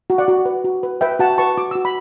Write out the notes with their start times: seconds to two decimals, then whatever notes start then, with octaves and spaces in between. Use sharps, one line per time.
0.10 F#4
0.18 D5 F#5
0.28 F#4
0.45 B4
0.65 F#4
0.83 B4
1.01 B4 E5 G5
1.19 F#4 F#5 A5
1.38 B4 A5 C#6
1.58 F#4 D6
1.71 F#4 E6
1.85 B5